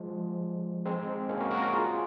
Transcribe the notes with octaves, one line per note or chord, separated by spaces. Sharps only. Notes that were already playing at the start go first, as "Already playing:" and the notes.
Already playing: F3 G#3
G#3 C4
A#3 C#4
F#4 A#4
F#4 A#4
F#4 A#4
F4 G#4